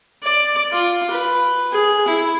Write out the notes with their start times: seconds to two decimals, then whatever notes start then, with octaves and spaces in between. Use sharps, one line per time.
0.23 D5
0.72 F4
1.11 B4
1.73 G#4
2.08 E4